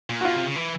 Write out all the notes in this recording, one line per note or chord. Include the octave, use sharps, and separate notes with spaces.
A#2
F#4
B2 F4
C3
C#3
E3